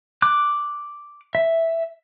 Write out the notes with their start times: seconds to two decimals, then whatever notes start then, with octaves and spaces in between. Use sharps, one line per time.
0.22 D6 F#6
1.35 E5